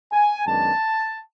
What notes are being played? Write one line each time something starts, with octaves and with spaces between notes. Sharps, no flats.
G#5
F#2 D#3 G#3 B3 D4 A5